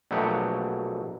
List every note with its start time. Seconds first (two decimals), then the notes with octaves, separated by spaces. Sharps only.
0.11 A#1 B2 F#3 A3 G4 F#5